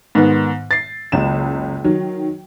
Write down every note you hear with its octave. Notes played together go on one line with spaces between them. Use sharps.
G#2 D#3 B3
A6 C7
F#1 C#2 E7
D#3 F#3